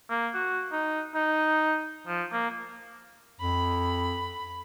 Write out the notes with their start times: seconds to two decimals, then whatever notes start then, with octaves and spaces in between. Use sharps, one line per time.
0.10 A#3
0.34 F#4
0.72 D#4
1.15 D#4
2.07 F3
2.32 A#3
3.41 F2 B5